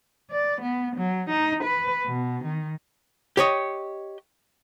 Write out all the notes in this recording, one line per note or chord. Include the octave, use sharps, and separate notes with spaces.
D5
B3
F#3
D#4
B4
B2
D#3
G4 C#5 D#5